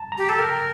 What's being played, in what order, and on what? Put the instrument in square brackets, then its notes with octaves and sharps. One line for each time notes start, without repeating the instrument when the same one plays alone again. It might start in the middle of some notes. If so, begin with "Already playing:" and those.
Already playing: [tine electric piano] A5 A#5
A#5
[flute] G4
[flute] A4 [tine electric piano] A5
[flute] A#4 [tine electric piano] G5